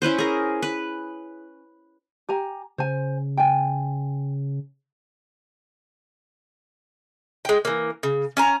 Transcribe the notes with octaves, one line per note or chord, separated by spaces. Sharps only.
C#4 E4 B4 C5
G#4 A#4
B4
G4 G#5 A#5
C#3 C5 G#5
G5 G#5
G#3 G5
E3 A#3
C#3
C#4 G#5 A#5